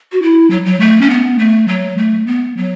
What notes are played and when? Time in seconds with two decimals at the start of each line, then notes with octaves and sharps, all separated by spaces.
0.12 F#4
0.22 E4
0.50 F#3
0.66 F#3
0.80 A3
1.01 C#4
1.10 B3
1.39 A3
1.68 F#3
1.98 A3
2.27 B3
2.57 F#3